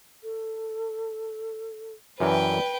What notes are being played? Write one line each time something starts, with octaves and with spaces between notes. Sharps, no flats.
A4
F#2 E3 A#4 B4 D5 G5